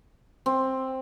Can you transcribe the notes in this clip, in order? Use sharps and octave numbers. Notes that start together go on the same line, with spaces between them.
C4